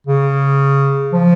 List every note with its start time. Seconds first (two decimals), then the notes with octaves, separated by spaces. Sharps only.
0.07 C#3
1.13 F3